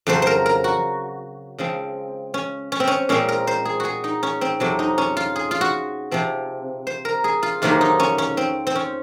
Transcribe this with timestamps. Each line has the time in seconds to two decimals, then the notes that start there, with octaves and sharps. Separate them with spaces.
0.07 F2 C#3 F#3 C5
0.22 A#4 C5
0.46 A#4
0.64 F#4
1.58 C#3 F3 G#3 C4
2.34 C#4
2.72 C#4
2.80 C4
2.87 C#4
3.09 A#2 G#3 C4 C#4
3.28 A#4
3.47 C5
3.65 G#4
3.80 F#4 G#4
4.04 D#4
4.23 C#4
4.41 C4
4.60 F2 C3 F#3
4.79 D#4
4.98 C#4
5.17 F4
5.36 G#4
5.51 F4
5.61 F#4
6.11 C3 F3 C4
6.87 C5
7.05 A#4
7.24 G#4
7.43 F4
7.62 F2 C3 D#3 F#3 A#3 F4
7.81 D#4
8.00 C#4
8.18 C#4
8.37 C4
8.67 C4
8.75 C#4